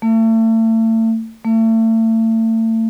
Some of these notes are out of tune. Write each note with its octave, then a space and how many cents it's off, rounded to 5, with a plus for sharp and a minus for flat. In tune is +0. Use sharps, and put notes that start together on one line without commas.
A3 +35
A3 +35